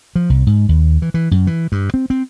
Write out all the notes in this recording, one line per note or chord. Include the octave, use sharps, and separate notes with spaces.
F3
C2
G#2
D#2
E3
E3
F#2
E3
G2
C4
C4